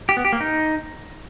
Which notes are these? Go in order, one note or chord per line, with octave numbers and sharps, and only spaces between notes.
G4
B3
G4
A#3
D#4